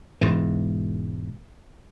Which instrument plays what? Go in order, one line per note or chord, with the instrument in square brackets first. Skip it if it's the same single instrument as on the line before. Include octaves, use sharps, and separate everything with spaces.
[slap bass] E1 G#2 E3